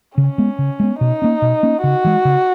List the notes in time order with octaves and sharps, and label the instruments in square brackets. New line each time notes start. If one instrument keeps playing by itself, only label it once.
[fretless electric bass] C#3 [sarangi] C#4
[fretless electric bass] G#3 B3
C#3
G#3 B3
[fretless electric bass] B2 [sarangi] D#4
[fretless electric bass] A#3 C#4
B2
A#3 C#4
[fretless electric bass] C#3 [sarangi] F#4
[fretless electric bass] E3 G#3
C#3